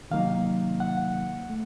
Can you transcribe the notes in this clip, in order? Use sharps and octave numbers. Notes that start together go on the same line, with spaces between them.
C3 D#3 F#3 A#3 D#4 F5
F#5
A3